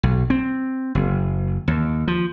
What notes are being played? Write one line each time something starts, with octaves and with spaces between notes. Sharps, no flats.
B1
C4
F#1
D#2
F3